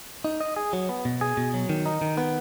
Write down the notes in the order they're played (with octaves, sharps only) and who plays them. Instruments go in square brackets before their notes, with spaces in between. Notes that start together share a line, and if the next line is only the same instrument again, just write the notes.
[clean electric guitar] D#4
D#5
G#4
F#3
B3
B2
G#4
B2
F#3
D#3
D#4
D#3
B3